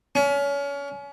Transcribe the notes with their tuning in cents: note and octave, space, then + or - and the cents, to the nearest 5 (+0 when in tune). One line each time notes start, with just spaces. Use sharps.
C#4 +30